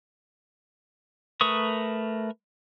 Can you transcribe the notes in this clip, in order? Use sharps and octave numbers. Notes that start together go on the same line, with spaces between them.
A3 A#4 B4 C#6 D#6